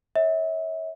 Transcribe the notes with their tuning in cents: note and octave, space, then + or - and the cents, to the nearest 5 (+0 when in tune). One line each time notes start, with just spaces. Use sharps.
C#5 +0 E5 -30